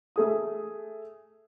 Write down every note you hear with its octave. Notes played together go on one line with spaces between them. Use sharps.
A3 G#4 D#6